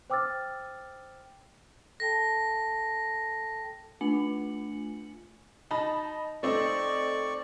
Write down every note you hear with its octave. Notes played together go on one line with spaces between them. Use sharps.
C5 G5 D6 E6 F6 A6
A4 G5 A5 A#6
A3 D4 F4 G#5 C#7 F#7
D#4 A5 B5
A3 C4 D#4 D5 C#6